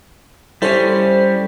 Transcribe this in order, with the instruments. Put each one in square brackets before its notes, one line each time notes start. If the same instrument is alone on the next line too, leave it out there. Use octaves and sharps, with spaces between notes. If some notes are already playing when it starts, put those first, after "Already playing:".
[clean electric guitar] G3 C#4 [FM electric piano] E4 A4 C5